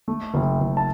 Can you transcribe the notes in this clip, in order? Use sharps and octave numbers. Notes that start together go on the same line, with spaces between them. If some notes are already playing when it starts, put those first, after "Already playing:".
A3
F#1
F#1
A5